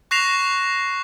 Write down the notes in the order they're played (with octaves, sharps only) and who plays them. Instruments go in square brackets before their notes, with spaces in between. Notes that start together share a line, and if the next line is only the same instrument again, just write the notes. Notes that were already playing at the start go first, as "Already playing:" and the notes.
[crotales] C#6 F#6 A#6 C7 E7 F7